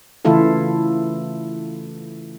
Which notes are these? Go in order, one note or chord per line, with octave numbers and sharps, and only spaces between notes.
C#3 E3 A3 E4 F4 A4